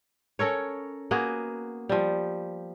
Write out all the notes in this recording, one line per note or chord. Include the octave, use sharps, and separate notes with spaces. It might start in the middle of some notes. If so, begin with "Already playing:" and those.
C#4 A4 A#4 C#5
A#3 B3 F#4 G#4
F3 G3